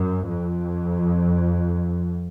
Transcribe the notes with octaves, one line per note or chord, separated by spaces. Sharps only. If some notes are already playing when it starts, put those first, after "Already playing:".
Already playing: F#2
F2